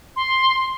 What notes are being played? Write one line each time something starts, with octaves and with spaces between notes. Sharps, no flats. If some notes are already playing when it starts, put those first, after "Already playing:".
C6